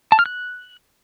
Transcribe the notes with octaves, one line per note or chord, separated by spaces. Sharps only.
A5
F6
F#6